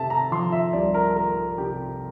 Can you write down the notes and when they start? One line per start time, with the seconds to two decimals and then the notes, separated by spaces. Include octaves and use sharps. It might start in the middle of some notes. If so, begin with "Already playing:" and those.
Already playing: C3 A3 E5 A5
0.10 A#5
0.32 F3 C6
0.52 E5
0.73 C2 D5
0.94 A#4
1.15 A3 A#4
1.58 C3 G4